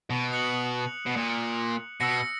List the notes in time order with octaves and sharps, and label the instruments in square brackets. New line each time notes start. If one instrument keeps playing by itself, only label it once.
[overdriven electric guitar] B2
[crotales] D#6 F#6 C#7 F#7
[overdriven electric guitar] B2
A#2
[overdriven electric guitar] B2 [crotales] E6 A#6 C#7